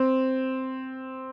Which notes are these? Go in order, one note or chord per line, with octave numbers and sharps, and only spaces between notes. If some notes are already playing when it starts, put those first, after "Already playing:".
Already playing: C4